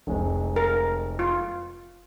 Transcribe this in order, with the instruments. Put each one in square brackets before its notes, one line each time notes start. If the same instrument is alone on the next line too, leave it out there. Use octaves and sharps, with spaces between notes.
[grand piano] F1 G#3 C4
[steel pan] A#4
F4